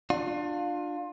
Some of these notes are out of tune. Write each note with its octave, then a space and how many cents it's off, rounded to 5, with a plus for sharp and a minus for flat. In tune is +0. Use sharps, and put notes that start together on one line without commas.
D4 +25 F4 +20